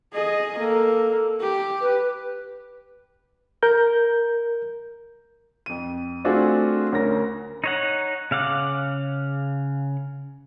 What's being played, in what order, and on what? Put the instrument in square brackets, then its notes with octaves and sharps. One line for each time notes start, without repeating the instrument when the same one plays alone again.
[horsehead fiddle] G#4 D#5
[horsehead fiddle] A#3 [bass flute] A4
[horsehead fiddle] G4
[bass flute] B4
[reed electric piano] A#4 G6
[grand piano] F2 D#7
A3 C4 D4 F4 F#4 G#4
D2 C#4 A#4 A#6
[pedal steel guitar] D#4 C#5 F#5
C#3 F5 F#5 D6